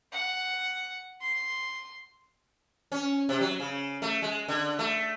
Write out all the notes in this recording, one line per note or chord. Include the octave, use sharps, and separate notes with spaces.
F#5
C6
C#4
C3
F#3
C#3
A3
G#3
D3
A3